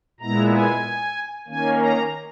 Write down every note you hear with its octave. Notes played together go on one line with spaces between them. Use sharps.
A#2 G#3 B3 E4 A#5
G#5
D#3 A#3 C#4 G#5
A#5